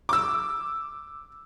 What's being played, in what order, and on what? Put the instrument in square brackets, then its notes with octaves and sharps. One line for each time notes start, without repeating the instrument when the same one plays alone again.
[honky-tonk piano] D6 E6